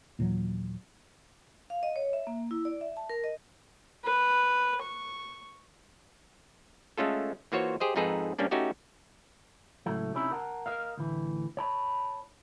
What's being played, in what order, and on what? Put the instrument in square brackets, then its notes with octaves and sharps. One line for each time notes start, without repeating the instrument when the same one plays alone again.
[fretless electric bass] D#2 A#2 E3 F#3
[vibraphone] F5
D#5
C#5
E5
A#3
E4
D5
E5
A5
A#4
D#5
[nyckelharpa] B4
C#6
[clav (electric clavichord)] G#3 A3 C#4 F4 A4
E3 A#3 F4 F#4 C5 C#5
G4 G#4 C5 D#5
F2 G#2 D#4 G#4 A4 B4
G2 G3 A#3 C#4 D4
A3 C#4 D#4 F#4 G4
[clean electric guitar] C#2 A2 F#3 A3
C3 C#4 D#4 E4
A#4 F#5 A5
A#4 D#5 F5
D2 A2 E3
C#5 A5 B5